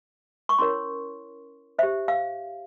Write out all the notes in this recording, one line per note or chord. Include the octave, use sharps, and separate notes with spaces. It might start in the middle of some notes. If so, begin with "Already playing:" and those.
C#6
C#4 E4 A#4 C#5 C6
G4 C5 E5
F5